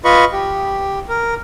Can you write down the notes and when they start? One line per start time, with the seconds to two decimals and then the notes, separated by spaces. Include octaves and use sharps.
0.05 F4 B4 D#5 B5 C#6
0.33 G4
1.09 A#4